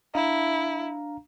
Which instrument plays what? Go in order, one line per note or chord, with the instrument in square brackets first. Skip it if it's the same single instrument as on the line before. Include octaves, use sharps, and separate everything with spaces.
[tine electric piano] D4 F5 A#5 [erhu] E4